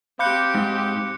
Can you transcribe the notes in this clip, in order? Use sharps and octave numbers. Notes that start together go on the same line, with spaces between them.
C4 G4 F5 B5 D6 F#6 G6 C#7
G#2